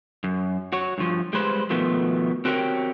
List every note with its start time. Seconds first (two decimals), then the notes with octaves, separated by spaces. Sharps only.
0.24 F#2
0.73 F#4 C#5
0.98 G2 F3
1.33 G3 G#3 B4 C5
1.70 B2 D#3 F3 A3 B3
2.45 C4 F#4 G4 A#4 C#5 G5